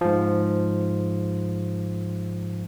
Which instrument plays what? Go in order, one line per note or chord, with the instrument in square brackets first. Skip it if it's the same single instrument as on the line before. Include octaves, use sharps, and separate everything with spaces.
[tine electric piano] G#2 F3